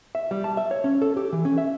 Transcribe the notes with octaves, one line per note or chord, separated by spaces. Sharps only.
E5
G3
A5
E5
C#5
C#4
A4
G4
E3
C#4
E5